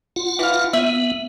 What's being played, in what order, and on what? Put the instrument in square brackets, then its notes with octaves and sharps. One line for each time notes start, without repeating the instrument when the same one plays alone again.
[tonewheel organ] F4 F#5
[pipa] E3 F5
[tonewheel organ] B3 [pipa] E5